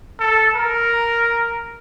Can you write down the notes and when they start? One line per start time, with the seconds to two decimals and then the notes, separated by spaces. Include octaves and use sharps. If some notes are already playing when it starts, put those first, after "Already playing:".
0.20 A4
0.56 A#4